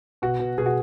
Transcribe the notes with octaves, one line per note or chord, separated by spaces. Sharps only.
B2 F#4
B2
B2 G#4
F#4